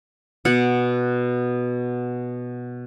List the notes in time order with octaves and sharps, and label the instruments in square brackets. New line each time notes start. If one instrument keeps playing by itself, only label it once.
[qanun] B2 F#5